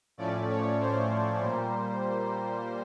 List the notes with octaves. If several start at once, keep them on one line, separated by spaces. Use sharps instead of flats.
A2 F3 A3 C#4 D5
C#5
C5
A#2 G3 A#3